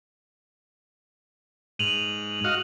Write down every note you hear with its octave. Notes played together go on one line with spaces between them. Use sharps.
G#2 D#7 F7 F#7
F#4 D#5 F5